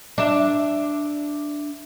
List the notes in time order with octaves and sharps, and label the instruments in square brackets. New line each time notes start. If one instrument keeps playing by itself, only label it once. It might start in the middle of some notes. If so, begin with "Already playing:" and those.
[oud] D4 E5